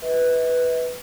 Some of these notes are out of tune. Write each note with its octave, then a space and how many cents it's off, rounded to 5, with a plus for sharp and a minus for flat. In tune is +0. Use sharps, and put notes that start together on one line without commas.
B4 +0 E5 -45